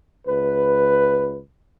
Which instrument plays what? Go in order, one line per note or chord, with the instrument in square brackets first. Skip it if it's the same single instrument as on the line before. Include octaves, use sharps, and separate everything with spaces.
[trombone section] C#2 B4